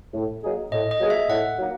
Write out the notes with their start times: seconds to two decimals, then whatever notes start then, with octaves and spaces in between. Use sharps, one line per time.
0.14 A2
0.43 F#3 A#3 D#4 G#4
0.72 A2 D#5
0.91 D#5
1.01 F#3 A#3 D#4 G#4
1.10 E5
1.29 A2 F#5
1.59 F#3 A#3 D#4